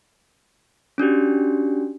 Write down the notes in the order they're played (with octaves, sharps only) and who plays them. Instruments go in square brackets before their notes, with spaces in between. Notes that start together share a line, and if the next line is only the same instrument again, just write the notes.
[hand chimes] C#4 D4 F#4 G4